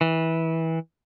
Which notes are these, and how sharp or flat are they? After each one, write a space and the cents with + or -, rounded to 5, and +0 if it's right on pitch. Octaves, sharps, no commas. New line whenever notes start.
E3 -20